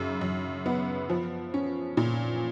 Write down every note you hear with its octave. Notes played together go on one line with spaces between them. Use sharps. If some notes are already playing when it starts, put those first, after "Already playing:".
Already playing: F#2 C#3
F#2
B3
F3
C#4
A#2